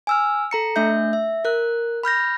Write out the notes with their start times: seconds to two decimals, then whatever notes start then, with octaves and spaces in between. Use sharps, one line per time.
0.07 G#5 E6 F6
0.51 A4 A#5 C#7
0.76 A3 D4 E5 G6
1.13 E5
1.45 A#4 F#6
2.03 B5 F6 G6 A#6